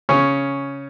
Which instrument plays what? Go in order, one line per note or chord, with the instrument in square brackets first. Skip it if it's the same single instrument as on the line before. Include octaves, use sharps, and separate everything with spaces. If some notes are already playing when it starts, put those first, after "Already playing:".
[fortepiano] C#3 C#4